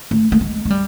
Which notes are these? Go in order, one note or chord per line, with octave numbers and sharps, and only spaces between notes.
A3
A3
G#3
G#3
G3